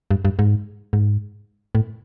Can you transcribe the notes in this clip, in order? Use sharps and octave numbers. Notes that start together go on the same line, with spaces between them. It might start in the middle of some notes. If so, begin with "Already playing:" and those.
G2
G2
G#2
G#2
A2